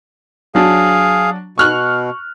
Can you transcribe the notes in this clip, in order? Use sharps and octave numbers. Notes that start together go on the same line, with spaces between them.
F#3 D4 G#4 F5
B2 C#6 F6 F#6